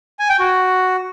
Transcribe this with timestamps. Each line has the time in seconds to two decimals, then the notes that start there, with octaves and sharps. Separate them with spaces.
0.19 G#5
0.29 G5
0.39 F#4